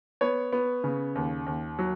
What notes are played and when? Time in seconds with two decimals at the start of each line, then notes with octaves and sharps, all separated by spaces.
0.21 B3 C#5
0.53 B3
0.84 C#3
1.15 D#2
1.46 D#2
1.79 F#3